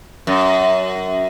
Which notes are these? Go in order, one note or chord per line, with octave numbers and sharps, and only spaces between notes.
F#2